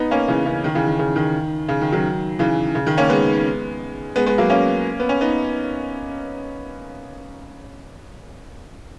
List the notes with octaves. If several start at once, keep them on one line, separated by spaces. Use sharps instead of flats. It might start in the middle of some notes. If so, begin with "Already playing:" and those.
Already playing: B3 D#4
A#3 C#4
C#3 E3
C#3
D#3
C#3 E3
D#3
C#3
D#3
C#3
D#3
D#3 F#3
C#3 E3
C#3
D#3
A#3 C#4
G#3 B3
G#3 B3
G#3 B3
F#3 A#3
A#3 C#4
B3
C#4
B3 D#4